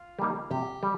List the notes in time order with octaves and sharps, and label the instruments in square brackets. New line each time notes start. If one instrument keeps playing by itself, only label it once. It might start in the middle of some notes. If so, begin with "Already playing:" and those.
Already playing: [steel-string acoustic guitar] F4
[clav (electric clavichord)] G3 A#3 D#4
[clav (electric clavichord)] C3 [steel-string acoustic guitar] G4
[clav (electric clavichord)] G3